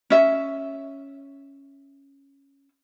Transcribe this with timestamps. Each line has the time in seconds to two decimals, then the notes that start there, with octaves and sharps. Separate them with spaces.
0.10 C#4 E5